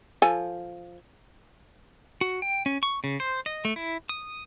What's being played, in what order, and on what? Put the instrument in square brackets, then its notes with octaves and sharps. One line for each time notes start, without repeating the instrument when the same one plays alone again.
[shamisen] F3 A4 G#5
[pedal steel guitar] F#4
G5
C#4
C#6
C#3
C5
D#5
A3
E4
D#6